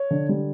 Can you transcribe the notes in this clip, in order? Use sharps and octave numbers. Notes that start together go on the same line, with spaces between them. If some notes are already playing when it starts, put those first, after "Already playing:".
Already playing: C#5
D3
G3